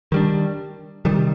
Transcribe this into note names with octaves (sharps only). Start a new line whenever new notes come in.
D#3 G3 D4
C3 D#3 G3